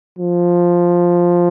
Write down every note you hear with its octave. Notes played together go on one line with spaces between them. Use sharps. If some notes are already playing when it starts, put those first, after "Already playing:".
F3